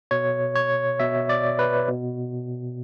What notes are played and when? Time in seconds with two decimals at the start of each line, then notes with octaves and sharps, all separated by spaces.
0.11 B2 C#5
0.55 C#5
1.00 B2 E5
1.29 D5
1.59 B4
1.88 B2